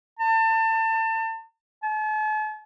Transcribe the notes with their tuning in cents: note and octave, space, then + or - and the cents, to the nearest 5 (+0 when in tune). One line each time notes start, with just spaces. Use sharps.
A5 +30
A5 -45